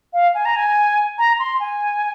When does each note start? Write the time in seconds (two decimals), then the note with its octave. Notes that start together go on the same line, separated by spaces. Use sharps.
0.13 F5
0.35 G#5
0.45 A#5
0.56 G#5
1.18 A#5
1.39 C6
1.60 G#5